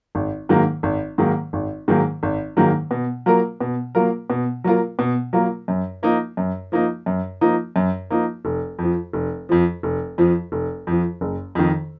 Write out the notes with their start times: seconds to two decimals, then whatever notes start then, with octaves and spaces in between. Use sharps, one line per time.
0.15 G#1
0.49 G#2 D#3 F#3 A#3
0.83 G#1
1.18 G#2 D#3 F#3 A#3
1.53 G#1
1.88 G#2 D#3 F#3 A#3
2.23 G#1
2.57 G#2 D#3 F#3 A#3
2.91 B2
3.26 F#3 A#3 F4 A#4
3.61 B2
3.95 F#3 A#3 F4 A#4
4.30 B2
4.64 F#3 A#3 F4 A#4
4.99 B2
5.33 F#3 A#3 F4 A#4
5.68 F#2
6.03 F3 A#3 D#4
6.37 F#2
6.72 F3 A#3 D#4
7.06 F#2
7.41 F3 A#3 D#4
7.76 F#2
8.10 F3 A#3 D#4
8.45 F1
8.79 F2 F3
9.13 F1
9.49 F2 F3
9.83 F1
10.18 F2 F3
10.52 F1
10.87 F2 F3
11.21 F#1
11.55 F2 D#3